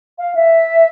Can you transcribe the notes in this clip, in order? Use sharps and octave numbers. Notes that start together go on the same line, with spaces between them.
F5
E5